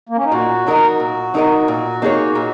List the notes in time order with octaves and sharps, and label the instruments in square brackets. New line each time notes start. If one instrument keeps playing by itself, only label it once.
[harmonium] A#3
C#4
D#4
[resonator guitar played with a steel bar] A#2 [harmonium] F#4
[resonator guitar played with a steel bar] F#3 D#4 A#4 D#5
A#2
F#3 D#4 A#4 D#5
A#2
A#3 D#4 G#4 C#5
A#2